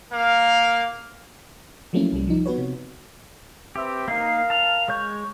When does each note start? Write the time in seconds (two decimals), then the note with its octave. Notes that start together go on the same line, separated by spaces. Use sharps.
0.12 A#3 F5
1.93 F3 F#3 A3 A#3 C#4 E4
2.12 C2 G3
2.28 F3 D#4
2.46 B3 F#4 B4 C#5
2.58 C3
3.76 C4 G4 B4 E5
4.08 A#3 D#4 A#4 F5 C7
4.50 A5 F6 F7
4.88 G#3 C#5 C#6 G6